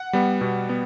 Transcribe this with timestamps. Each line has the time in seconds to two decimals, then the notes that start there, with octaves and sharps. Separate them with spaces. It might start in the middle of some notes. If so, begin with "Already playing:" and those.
Already playing: F#5
0.13 G3 B3
0.41 B2
0.69 B3